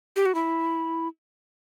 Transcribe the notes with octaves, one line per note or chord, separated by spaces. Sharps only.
G4
F#4
E4